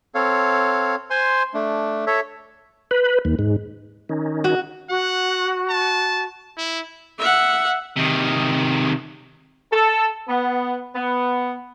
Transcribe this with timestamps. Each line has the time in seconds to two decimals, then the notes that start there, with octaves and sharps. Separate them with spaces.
0.15 C4 A4 C#5 F5
1.10 C5 G#5 C6
1.54 A3 D4
2.07 A4 C#5 E5
2.91 B4
3.25 D#2
3.39 G#2
4.09 D#3 C#4 D#4
4.44 F#4
4.90 F#4 F#5
5.69 A5
6.58 E4
7.19 E5 F#5
7.97 C3 D#3
9.72 A4
10.28 B3
10.95 B3